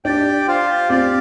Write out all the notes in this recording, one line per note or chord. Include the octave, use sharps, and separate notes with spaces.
D4 G4 D5 G5
F4 C5 F5
C4 G4 D5 F5